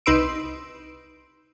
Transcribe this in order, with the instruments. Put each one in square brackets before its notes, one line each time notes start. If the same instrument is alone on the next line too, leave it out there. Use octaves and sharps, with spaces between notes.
[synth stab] C2 D#4 B4 C6 E6 D7